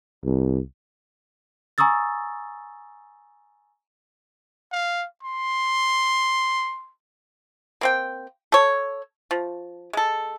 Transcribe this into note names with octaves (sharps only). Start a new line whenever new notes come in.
C2
G#5 A#5 C#6 D#6 E6 A6
F5
C6
A#3 C4 G5
A4 C#5
F3
G#3 A4